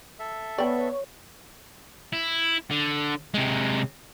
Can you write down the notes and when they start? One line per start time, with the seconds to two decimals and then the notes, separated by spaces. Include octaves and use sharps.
0.19 A4 E5
0.58 B3 C#5 D5 G5
2.13 E4
2.71 D3
3.34 C3 G#3